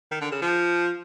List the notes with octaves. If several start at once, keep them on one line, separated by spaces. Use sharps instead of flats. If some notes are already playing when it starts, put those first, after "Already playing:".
D#3
D3
C#3
F3